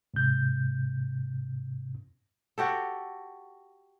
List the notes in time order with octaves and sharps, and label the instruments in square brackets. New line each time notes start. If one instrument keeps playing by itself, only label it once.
[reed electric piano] G#2 C3 G6
[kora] F#4 G4 A4